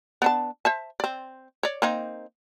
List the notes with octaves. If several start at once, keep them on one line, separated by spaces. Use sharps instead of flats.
B3 D4 A5
C5 E5 A5
C4 D5
C#5 D5
A#3 C4 D#4